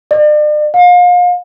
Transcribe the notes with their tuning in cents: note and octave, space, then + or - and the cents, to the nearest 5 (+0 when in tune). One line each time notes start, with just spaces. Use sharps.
D5 +40
F5 +35